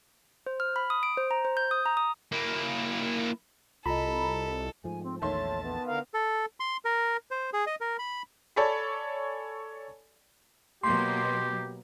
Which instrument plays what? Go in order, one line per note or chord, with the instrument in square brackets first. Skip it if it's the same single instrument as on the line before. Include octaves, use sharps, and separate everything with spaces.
[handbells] C5
F6
B5
D#6
D7
C5
A#5
C5
G6
D#6
A#5
D#6
[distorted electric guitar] A#3 E4
[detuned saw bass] C2 [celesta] F4 D#5 [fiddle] A4 [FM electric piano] A#5 B5
[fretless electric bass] G#2 F3 A3 [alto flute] G#5
[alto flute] C4
[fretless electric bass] A#1 E2 A3 [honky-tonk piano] D#3 E5 C6 [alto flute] C#5 [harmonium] A5
[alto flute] B3
[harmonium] D3 A#4 F5
[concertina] A4
C6
A#4
C5
G#4
D#5
A#4
B5
[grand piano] A4 C#5 D5 G#5 A5 B5
[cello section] B2 F#3 A#3 [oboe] G4 [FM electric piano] C6